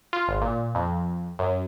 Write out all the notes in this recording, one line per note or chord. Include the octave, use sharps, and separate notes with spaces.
F4
G#1
A#2
F2
F#2